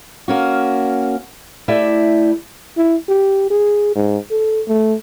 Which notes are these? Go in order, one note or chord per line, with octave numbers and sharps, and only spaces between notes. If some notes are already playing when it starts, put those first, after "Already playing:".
A#3 C#4 F#4
A3 E4 G4 D5 E5
E4
G4
G#4
G#2
A4
A3